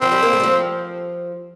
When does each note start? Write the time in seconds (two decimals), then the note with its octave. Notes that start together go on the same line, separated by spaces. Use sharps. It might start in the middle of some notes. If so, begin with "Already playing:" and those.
0.01 F3 C4
0.12 G3
0.23 A#3
0.33 A3
0.40 G3
0.43 F3